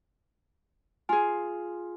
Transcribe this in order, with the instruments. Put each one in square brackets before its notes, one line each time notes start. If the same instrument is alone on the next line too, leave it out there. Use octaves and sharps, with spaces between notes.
[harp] F4 G#4 [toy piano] G#5